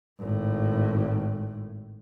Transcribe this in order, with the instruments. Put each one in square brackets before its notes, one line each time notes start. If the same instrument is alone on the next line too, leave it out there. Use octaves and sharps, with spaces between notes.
[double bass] G#1 A2